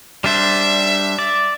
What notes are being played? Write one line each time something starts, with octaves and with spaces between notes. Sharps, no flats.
G3 D4 C5 E5
D5